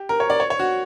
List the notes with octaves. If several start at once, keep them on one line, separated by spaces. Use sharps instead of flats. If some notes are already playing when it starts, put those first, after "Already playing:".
Already playing: G4
A#4
C#5
D5
C#5
C#5
F#4